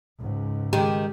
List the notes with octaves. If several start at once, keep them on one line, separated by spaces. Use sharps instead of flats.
C#2 G#2
D#3 G#3 G4